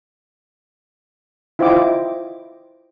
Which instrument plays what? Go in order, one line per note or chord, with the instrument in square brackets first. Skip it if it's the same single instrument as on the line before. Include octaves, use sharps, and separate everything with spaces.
[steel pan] E4 F4 C5 D#5 G5 D6